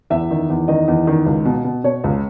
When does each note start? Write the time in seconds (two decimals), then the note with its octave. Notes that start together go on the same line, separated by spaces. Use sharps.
0.10 E2 E5
0.31 D#3
0.50 E2
0.68 D#3 D#5
0.88 E2
1.07 D#3
1.26 C#2
1.45 B2
1.64 B2
1.84 B2 C#5
2.04 C#2